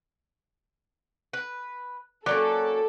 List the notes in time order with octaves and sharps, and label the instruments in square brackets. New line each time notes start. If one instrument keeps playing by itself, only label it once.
[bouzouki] B4
[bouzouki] F#3 A#3 C#4 [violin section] A4 [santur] D5